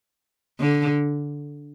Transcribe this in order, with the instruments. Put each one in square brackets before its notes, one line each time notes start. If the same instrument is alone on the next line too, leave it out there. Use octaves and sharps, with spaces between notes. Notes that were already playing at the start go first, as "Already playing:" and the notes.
[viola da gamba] D3